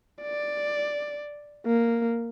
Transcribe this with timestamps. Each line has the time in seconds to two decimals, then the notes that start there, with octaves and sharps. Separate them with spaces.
0.22 D5
1.66 A#3